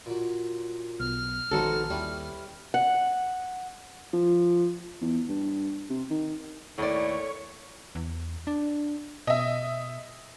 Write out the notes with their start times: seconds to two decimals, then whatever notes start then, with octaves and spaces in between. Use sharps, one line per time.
0.06 A#2 F#3
1.00 B1 F6
1.51 A#1 D#3 D#4 F#4 G#4 A4 B4 C5
1.90 D#2 G3 C#4 E4 B4
2.74 F#5
4.13 F3
5.01 E2
5.29 G2
5.90 C3
6.10 D#3
6.78 D#2 A2 C#5 D5
7.95 E2
8.47 D4
9.27 B2 D#5 E5